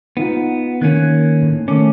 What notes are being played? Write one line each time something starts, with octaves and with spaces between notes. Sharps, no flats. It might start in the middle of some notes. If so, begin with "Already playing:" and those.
B3 D#4 F4 F#5
D#3 A#3 C#4 F#6 G#6
A2
D#3 A3 C#4 D6